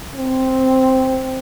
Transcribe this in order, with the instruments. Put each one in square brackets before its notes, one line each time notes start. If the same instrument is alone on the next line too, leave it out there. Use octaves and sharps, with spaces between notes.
[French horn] C4